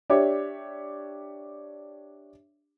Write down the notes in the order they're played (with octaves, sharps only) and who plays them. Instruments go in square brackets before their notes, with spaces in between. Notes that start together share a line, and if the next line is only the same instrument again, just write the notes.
[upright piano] D4 G4 C#5 E5